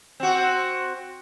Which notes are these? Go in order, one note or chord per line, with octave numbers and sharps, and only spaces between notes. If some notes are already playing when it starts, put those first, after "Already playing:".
C4 F#4